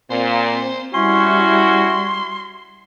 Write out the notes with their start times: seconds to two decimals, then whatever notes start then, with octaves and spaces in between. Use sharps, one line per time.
0.10 A#2 C4 C5
0.94 G3 C#4 E4 F#4 C6